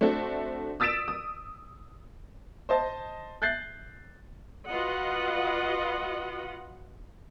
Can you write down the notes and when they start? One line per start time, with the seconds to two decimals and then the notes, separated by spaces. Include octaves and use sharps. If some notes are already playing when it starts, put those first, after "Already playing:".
0.01 A3 C4 D4 F#4 A4
0.80 D#6 E6 A6 B6 D7 E7
1.08 D#6
2.69 C5 D#5 A5
3.42 F#6 G6 A6 C7
4.69 F4 F#4 B4 D#5 F#5